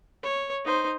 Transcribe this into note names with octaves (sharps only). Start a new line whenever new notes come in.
C#5
D#4 C5